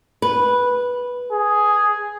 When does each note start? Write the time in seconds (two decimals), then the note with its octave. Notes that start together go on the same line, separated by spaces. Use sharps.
0.22 B4
1.32 G#4